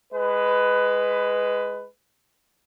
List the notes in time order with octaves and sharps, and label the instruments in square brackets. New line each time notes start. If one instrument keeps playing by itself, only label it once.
[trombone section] G#3 B4